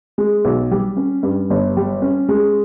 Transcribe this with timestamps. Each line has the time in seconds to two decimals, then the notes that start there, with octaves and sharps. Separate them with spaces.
0.18 G#3
0.45 B1
0.71 G3
0.97 C#4
1.23 G2
1.50 G1
1.77 G3
2.02 C#4
2.29 G#3